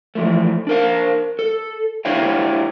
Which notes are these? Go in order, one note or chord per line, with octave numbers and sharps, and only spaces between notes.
E3 F3 A3
D4 A#4 F5
A4
D4 E4 G4 C#5 F5 G5